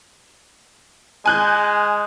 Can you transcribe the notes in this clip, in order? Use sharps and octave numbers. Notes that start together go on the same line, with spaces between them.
G#3 G#5 F#6 G6